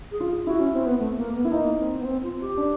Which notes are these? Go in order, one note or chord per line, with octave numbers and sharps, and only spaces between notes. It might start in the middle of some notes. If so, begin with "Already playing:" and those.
G#4
F4
E4 F#4
C#4
C4
B3
A3
A#3
B3
E4
A#3 D#4
C4
B3
C4
F4
G4
D4